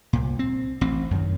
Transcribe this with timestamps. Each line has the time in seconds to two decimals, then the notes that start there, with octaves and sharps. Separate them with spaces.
0.13 C2 A#2
0.39 C4
0.81 A1 C4
1.11 F#2 D#3